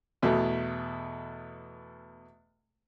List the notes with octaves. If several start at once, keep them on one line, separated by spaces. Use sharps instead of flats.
E2 B2 A3